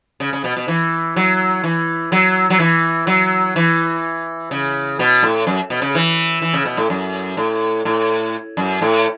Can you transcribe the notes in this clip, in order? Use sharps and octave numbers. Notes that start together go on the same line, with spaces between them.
C#3
C#3
B2
B2
E3
F#3
E3
F#3
F#3
E3
F#3
E3
C#3
B2
A2
F#2
B2
C#3
E3
E3
C#3
B2
A2
F#2
A2
A2
F#2
A2